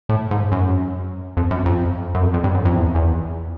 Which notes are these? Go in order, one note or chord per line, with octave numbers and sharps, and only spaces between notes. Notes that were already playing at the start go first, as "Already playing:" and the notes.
A2
G#2
F#2
F2
F#2
F2
F#2
F2
F2
G2
F#2
F2
E2
E2